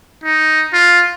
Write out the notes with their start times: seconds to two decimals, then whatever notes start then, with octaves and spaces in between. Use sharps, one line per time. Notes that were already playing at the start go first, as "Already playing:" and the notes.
0.24 D#4
0.73 F4